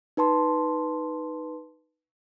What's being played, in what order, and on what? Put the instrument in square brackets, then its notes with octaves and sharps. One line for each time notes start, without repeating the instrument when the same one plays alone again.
[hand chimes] D#4 B4 A5 C6